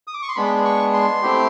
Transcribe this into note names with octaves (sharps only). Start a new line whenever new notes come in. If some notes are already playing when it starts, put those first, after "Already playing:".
D#6
D6
C#6
C6
G#3 B3 D4 B5
C#6
C6
A3 C4 E4 G4